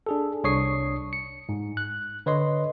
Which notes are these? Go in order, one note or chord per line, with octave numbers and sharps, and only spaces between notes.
D4 G#4 A4
C2 D4 C#5 C#6 D#6 C7
C#7
G#2
F#6
D3 B4 C#5 D#5 C6